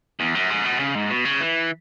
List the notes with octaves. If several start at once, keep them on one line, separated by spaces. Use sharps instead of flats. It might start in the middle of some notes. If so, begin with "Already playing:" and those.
E2
F#2
G#2
B2
C#3
G#2
B2
C#3
E3